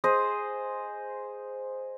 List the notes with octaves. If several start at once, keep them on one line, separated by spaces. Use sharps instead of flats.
G#4 C5 D#5